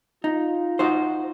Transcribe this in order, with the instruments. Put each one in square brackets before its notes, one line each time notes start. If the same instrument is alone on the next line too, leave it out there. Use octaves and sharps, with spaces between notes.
[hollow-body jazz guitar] D#4 [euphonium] F4
[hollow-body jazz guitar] D#4 F#4 C5